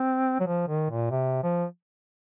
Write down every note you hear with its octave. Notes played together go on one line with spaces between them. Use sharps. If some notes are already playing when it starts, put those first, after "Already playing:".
Already playing: C4
F#3
F3
D#3
A#2
C3
F3